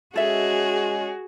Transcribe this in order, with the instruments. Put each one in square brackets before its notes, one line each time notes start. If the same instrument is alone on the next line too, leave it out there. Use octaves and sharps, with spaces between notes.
[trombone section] G#3 C#4 [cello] F#4 [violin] G#4 [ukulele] A4 E5